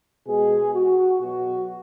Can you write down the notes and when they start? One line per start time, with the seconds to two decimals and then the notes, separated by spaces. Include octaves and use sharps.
0.27 B2 G#3 G#4
0.74 F#4
1.20 B2 F#3 F#4